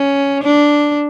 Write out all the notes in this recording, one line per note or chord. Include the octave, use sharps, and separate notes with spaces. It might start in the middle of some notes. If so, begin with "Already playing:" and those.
Already playing: C#4
D4